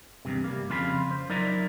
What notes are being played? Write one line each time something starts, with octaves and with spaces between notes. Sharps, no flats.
E2 G2 C3
G3 A#3
F2 C#3 F4 A4 B5
C5
F#3 D#4 E4 A#4 D5